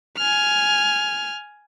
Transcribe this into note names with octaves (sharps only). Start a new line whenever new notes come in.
G#5 F6